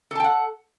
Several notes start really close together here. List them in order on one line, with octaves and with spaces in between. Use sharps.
A4 A5 G5 F#5